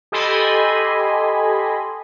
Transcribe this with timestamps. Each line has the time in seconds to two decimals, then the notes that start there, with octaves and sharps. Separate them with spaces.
0.12 G4 A4 D#5 G#5 B5 C6